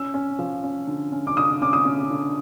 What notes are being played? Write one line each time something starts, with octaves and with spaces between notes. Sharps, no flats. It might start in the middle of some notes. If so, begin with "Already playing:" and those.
Already playing: C#4 E6
C#4
F3
C#4
D3
C#4
D6
D3 D#6
C#4 D6
D#6
C#4
D3